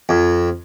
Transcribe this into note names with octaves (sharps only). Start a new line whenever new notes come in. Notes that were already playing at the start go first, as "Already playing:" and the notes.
F2